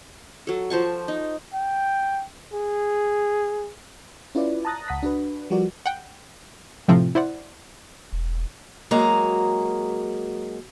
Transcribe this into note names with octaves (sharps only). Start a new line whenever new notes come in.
F#3 A4
F3 C5 A5 C#6
D#4
G5
G#4
C#4 E4 F4 B4 D5
A5 A#5 D#6 F#6 A6 A#6
C#2 F#5 D#6 F#6 B6
D4 F#4 B4
F3 G3 F#4 A#4 D5
F#5 G5
A2 C3 F3 A3 C4
E4 C5 D5 F#5
E1
F#3 G#3 A#3 F#4 G#4 A#5